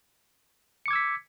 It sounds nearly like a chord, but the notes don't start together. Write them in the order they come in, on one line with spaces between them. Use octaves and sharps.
C#7 D6 G#6 E6 B6